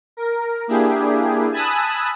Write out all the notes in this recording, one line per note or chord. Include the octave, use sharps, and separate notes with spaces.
A#4
A#3 D4 E4 G4 G#4
G#5 A5 B5 D#6 E6 F#6